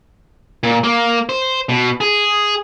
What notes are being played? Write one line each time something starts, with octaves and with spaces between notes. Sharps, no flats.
A#2
A#3
C5
B2
G#4